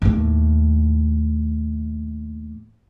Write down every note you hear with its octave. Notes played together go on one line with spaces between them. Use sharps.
D#2 A2